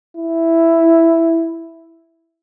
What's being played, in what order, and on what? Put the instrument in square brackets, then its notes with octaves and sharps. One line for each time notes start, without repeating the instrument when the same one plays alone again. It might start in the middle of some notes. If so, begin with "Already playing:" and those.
[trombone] E4